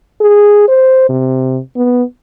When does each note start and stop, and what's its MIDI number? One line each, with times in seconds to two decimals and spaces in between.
0.21 0.64 68
0.68 1.08 72
1.09 1.60 48
1.76 2.03 59